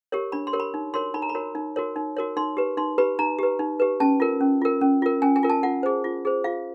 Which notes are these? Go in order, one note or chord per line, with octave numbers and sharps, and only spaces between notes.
G4 A#4 C#5
D4 B5
C6
G4 A#4 C#5
B5
D#4
F#4 A#4 C#5 C6
D#4 B5
A#5
B5
F#4 A#4 C#5
D#4
F#4 A#4 C#5
D#4
F#4 A#4 C#5
D#4 C6
G4 B4
D#4 C6
G4 B4 B5
D#4 A#5
G4 B4
D#4
G4 B4
C#4 A5
F4 A#4
C#4
F4 A#4
C#4
F4 A#4
C#4 G#5
G#5
F4 A#4
A5
F4 F#5
G#4 C5
F4
G#4 C5
F4 F5